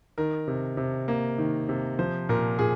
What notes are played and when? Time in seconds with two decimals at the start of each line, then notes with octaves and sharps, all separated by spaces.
0.18 D#3 A#4
0.48 C3
0.77 C3
1.08 A#3
1.38 D#3
1.69 C3
1.99 F3 C5
2.29 A#2 A#4
2.59 A#2 G#4